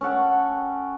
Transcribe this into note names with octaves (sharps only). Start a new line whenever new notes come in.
C#4 A4 F#5 G5